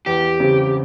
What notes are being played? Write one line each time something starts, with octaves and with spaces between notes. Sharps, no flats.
E2 G4
C#3 G3 C4